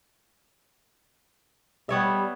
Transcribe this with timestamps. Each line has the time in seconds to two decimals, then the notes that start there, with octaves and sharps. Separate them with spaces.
1.89 G3 B3 C#5 E5